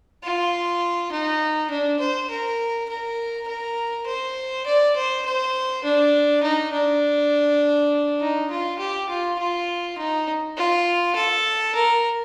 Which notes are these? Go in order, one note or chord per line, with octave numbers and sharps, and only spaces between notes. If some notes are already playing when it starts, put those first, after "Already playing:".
F4
D#4
D4
C5
A#4
A#4
A#4
C5
D5
C5
C5
D4
D#4
D4
D#4
F4
G4
F4
F4
D#4
F4
A4
A#4